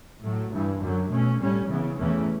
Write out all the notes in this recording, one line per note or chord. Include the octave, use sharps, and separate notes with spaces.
A2 F#3 A3
G2 E3 G3
F#2 D3 F#3
B2 A3 C#4
A2 G3 C#4
C#3 E3 B3
E2 C#3 E3 A3 C#4